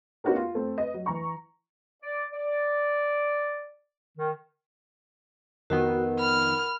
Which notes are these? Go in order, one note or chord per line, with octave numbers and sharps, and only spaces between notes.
B3 C#4 D#4 F#4 G4 A#4
F4
A3 C4
B4 D#5
F#3
E3 A#5 C#6
D5
D5
D#3
F2 D#3 B3 F#4 A#4 F#5
B5 F6